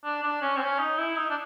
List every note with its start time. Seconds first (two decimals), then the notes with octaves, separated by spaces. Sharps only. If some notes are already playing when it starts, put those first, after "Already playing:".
0.04 D4
0.23 D4
0.42 C#4
0.56 C4
0.61 C#4
0.79 D#4
0.98 E4
1.16 D#4
1.30 D4